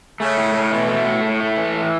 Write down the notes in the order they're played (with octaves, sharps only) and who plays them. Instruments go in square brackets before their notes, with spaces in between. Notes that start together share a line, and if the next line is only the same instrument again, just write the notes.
[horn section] C#3 [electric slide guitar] A3
[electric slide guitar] A2
A2
[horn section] B2 [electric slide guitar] E3
[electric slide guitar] A3
A2
[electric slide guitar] A2 [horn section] C#3
[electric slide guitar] A3
E3
A2